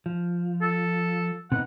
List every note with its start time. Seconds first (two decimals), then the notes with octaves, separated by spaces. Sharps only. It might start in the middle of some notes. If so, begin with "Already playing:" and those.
0.06 F3
0.62 A4
1.52 C3 B3 D#4 F#5